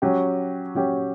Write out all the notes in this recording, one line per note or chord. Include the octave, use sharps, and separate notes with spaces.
F#3 C#4 G4
F#3 C#4 G4